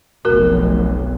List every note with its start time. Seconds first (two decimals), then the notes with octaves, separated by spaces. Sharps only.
0.25 F1 B1 F#4 A#4